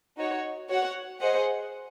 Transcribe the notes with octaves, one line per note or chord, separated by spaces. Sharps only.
D#4 F#4 C#5
F#4 C#5 F#5
G#4 C5 D#5 F#5